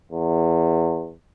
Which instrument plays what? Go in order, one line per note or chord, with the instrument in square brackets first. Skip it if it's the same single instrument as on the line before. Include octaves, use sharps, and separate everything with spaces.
[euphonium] E2